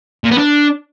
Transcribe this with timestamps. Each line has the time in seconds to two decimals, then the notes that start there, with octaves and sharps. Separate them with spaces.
0.24 A#2
0.31 B3
0.38 D4